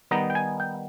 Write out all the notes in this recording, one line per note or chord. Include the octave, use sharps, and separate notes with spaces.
D#3 G3 B3 D#4 A#5
G5
G#5
G5